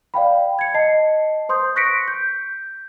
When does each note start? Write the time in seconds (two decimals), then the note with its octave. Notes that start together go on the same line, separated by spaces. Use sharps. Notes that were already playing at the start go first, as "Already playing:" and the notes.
0.14 D5 F5 G5 B5
0.59 G#6 C#7
0.74 D#5 A5 C7
1.49 C5 C6 D#6 G6
1.76 C#6 F#6 A#6 B6 C#7 D7
2.08 G6